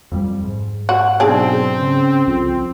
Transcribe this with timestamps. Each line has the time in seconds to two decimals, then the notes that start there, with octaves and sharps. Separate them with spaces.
0.12 F2 G3
0.44 G#2
0.89 F#4
1.20 B1 C4 D4 G#4
1.78 C#3
2.27 C2 F2